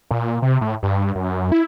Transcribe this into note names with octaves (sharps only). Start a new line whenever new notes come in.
A#2
C3
A2
G2
F#2
E4